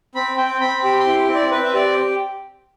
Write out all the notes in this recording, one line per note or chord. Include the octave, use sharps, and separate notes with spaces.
C4 B5
C4 G5
C4 B5
G4 B5
C6
E4
C4
D5
C4 B4
E5
G4 D5